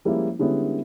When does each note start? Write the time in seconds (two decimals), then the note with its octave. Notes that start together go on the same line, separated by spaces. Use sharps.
0.05 F3 G3 G#3 A#3 C#4 E4
0.39 D3 G3 G#3 B3 C#4 E4